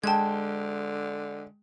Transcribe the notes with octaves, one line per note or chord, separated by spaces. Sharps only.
D3 G#3 G5 A5 G#6